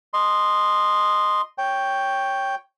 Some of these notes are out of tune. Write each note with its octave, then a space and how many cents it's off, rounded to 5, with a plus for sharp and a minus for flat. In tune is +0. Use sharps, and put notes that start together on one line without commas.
D#5 -10 C6 +0
C#5 +0 G5 +0